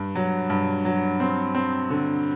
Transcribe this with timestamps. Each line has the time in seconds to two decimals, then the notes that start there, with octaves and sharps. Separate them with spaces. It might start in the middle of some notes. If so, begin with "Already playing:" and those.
Already playing: G2
0.15 F#3
0.50 G2
0.85 F#3
1.20 C4
1.55 C4
1.90 D3